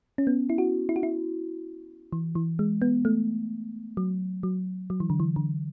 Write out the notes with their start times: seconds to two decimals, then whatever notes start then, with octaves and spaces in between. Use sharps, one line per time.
0.18 C#4
0.27 B3
0.50 E4
0.58 F#4
0.89 E4
0.96 F#4
1.03 E4
2.12 E3
2.35 E3
2.59 G#3
2.82 B3
3.05 A3
3.97 F#3
4.43 F#3
4.90 F#3
5.00 E3
5.10 D3
5.20 E3
5.36 D3